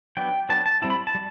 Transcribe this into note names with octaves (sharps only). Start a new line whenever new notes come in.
F#3 B3 D4 G5
F#3 B3 D4 A5
A5
G3 C4 E4 A5
B5
A5
G3